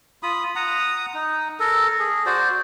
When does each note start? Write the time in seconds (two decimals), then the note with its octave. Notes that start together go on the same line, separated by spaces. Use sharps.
0.23 F4 B5 D#6
0.56 F#5 A#5 D#6
1.14 D#4
1.60 A4 A#4
1.99 G#4
2.26 F#4 C5 D5